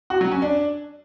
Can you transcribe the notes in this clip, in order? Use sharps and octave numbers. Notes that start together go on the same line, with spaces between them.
F#4
F#3
C#4
D4